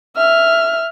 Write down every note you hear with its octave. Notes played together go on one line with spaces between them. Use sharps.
E5 F6